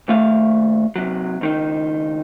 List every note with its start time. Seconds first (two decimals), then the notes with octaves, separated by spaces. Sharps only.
0.08 D#2 A3 F5
0.96 C3 F#3
1.41 C#2 D#3 D#4